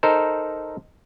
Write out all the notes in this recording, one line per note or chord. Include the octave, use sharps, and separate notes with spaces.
D#4 A4 A#4 C5